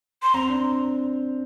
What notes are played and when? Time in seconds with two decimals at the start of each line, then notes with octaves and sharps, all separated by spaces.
0.22 C6
0.34 C4 A#5
0.49 D4